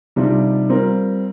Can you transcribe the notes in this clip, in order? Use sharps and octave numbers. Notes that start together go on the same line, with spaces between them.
C3 D#3 G3 D4 F4
G3 C4 F4 A#4